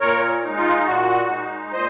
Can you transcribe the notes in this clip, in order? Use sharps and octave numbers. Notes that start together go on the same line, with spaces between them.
A#2 A#4 C#5
G#3 D#4
F4
A#2 F#4
G#3 D#4
A#2 C5 D#5